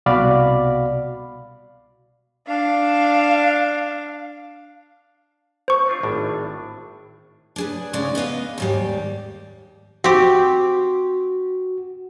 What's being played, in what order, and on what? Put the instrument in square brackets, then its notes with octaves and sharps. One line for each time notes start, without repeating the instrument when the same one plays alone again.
[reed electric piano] C2 B2 F#4 D5 F5 B5
[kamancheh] D4 F5
[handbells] C5 C#6
[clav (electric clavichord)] C4 D4 F4
G#1 A2 D4
[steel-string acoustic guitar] D4 G#4 B4
D2 C#3 G#3 D#4 D5
B3 B4 D#5 F5
D#2 G#2 G3
[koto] C4 G4 [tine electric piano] F#4